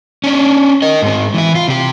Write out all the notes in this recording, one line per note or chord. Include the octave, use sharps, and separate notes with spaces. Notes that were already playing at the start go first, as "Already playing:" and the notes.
C#4 D4
A#4 D#5
G#2 C4
E3 E4
F4
C3 G4